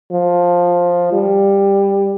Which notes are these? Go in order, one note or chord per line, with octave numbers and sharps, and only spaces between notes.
F3
G3